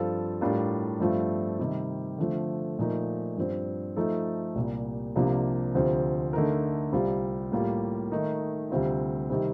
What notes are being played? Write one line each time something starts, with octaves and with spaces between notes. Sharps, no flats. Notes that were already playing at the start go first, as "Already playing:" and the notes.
Already playing: G2 F3 C4 F4 A4
A2 G3 D4 F4 A#4
G2 F3 A3 C4 F4
C3 D#3 G3
D3 F3 A3 C4
A#2 F3 A3 D#4 A#4
G2 F3 C4
F3 A3 D#4 A4
C2 A#2 G3 A#3
C2 C3 F3 A#3 D4
D2 C3 F3 C4
D3 A3 D#4 A#4
C2 C3 G3 C4 F4
A2 G3 A#3 F4
D#3 A3 D#4 A#4
D2 C3 G3 C4 F4
C3 D#3 G3 C4